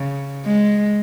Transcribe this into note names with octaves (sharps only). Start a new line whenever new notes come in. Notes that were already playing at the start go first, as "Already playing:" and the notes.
Already playing: C#3
G#3